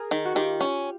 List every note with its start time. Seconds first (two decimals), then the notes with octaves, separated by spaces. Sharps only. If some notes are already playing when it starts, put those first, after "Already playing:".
Already playing: G#4 A#4
0.11 D#3
0.26 F#4
0.35 D#3 F4 G4
0.61 C#4